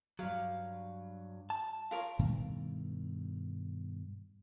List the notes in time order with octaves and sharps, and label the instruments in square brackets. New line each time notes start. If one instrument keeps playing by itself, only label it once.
[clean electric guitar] G2 F#3 [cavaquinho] F5
[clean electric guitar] A5
[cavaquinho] F4 A#4 C#5
[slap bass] G2 B2 D#3 A3